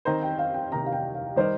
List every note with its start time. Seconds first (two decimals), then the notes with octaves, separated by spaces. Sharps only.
0.05 D#3 C4 D#4 C5 A#5
0.23 G5
0.39 F5
0.54 G5
0.72 C3 D#3 A#3 D#4 A#4 A#5
0.86 F5
0.93 G5
1.14 F5
1.36 D#3 G3 D#4 A#4 C5